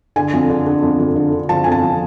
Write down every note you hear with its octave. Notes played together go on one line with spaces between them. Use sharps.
D3 G#5
F2
D3
D3
F2
F2
D3
D3
F3 A5
F2 G#5
A5
F3